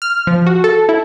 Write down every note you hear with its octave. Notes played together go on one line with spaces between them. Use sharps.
F6
F3
F#4
A4
E4